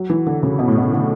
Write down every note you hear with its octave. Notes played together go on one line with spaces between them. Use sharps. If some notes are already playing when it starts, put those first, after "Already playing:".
Already playing: F#3
E3
D3
C#3
B2
A2
B2
D3